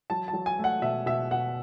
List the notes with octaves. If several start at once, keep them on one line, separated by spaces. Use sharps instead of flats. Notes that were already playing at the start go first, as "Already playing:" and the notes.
F#3 A5
A5
F#3
G#5
A3
F#5
B2 E5
B2 E5
B2 F#5